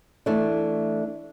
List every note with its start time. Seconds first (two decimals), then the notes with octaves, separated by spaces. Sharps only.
0.26 E3 A3 D4